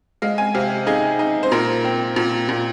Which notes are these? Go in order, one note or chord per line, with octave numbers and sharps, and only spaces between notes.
G#3 F5
G#5
C3 F5
D#4 G#4
D#4
C5
A#2 A#4
C4
A#2
A#2